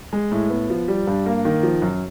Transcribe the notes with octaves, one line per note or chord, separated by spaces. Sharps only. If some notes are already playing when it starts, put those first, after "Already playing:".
G#3
A2
B3
F3
G3
G2
A#3
D#3
F3
F#2